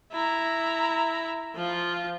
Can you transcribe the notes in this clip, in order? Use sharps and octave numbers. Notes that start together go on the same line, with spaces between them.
E4 A#5
F3 F4